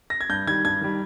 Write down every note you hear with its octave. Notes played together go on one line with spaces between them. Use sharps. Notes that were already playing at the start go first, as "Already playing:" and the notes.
A#6
G#6
G2 G6
D#3 G3 G#6
G2 G#6
D#3 G3